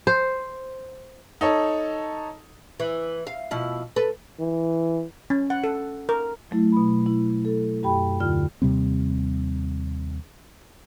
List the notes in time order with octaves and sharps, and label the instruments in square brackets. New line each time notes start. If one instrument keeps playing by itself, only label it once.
[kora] C5
[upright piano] D#4 A4 C#5
[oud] E3
F5
B2 F3 E4
A4 B4
[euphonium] E3
[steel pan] C#4
F#5
A4
A#4
[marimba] F#3 A3 E4
B2 B5
E4
A4
F#2 G4 G5 B5
D#2 D3 F4 F6
[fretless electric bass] D#2 C3 G3 C4